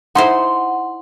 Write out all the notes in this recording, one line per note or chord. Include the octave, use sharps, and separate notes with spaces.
D#4 E4 C5 F#5 C6